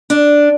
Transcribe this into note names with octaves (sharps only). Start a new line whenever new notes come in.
D4